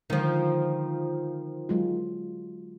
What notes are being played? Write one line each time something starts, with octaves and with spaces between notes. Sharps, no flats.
D3 D#3 F3 G#3
F#3 G#3 F4